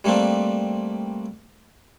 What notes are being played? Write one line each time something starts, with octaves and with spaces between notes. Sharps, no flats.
G3 A3 A#3 C4 D4